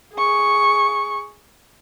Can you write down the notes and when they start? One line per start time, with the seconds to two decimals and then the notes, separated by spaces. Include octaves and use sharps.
0.14 G#4 C#6